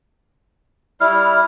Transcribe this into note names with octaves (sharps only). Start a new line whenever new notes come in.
G3 E4 F6